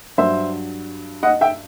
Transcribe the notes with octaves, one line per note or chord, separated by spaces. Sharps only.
G2 F#3 C5 E5
D#5 F#5
E5 G5